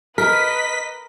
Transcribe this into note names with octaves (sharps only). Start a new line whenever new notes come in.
A#4 B4 D#5 B6